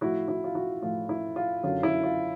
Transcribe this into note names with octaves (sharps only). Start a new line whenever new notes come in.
A2 F3 E4 F#4
E4 F#4
F4
E4 F#4
A2 F3 F4
E4
F4
F#2 D3 F#3 F4
E4
F4